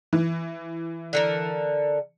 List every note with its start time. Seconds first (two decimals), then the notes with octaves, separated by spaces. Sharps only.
0.13 E3
1.13 D3 A4 A#4